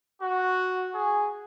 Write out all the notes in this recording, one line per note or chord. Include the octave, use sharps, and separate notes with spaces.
F#4
G#4